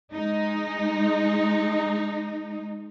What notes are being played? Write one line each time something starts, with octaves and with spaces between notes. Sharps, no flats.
G#3 D#4